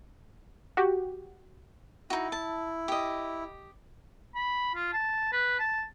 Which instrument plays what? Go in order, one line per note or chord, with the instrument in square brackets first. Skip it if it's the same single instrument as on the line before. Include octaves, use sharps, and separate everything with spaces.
[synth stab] F#4 G4
[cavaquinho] D#4 F#4 [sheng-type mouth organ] E4
[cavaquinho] A5
G4 D#5
[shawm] B5
F4
A5
B4
A5